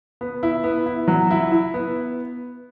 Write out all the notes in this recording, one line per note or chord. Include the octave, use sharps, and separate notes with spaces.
B3
E4
B3
E4
F#3
E4
E4
B3